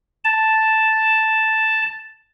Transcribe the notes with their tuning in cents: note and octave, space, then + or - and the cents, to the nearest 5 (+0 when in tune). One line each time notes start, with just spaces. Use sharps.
A5 +0